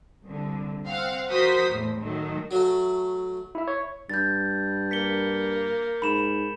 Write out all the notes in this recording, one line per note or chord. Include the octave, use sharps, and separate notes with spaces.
C2 D3
C4 F5 F#5
F3 F#4 A#4 C5 D#6 B6
E2 A2
A2 D#3 F#3 A3
F#3 A3
E4 E5
C#5
G2 G6 A6
A#3 B6 C#7 G7
G#2 B5 E7